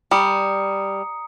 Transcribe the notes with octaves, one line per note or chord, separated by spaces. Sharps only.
G3 A#5 D#6 C#7